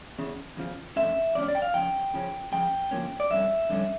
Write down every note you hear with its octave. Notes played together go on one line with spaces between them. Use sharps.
E2 C#3
E2 C#3 F3
F2 D3 A3 C#4 E5
F2 D3 A3 C#4 D5
D5
G5
F5
C#3 F3 C#4 G5
C#3 F3 C#4
C#3 F3 G5
C#3 F3 A#3 C#4
D5
F2 D3 G3 C#4 E5
F2 D3 G3 C#4